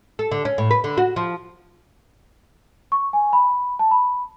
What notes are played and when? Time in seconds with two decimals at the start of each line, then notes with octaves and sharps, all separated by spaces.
0.19 A4
0.32 D3
0.45 C#4
0.58 A2
0.71 B4
0.84 D3
0.97 F#4
1.16 F3
2.92 C#6
3.13 G#5
3.33 B5
3.79 A5
3.91 B5